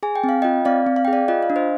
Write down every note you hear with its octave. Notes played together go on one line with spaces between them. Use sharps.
G#4 G#5
G5
C4
F5
F4 D#5 G5
C4 D5 F5
C4
F5
G5
G#4
D5 F5
F4 D#5
F5
D4
C5 D#5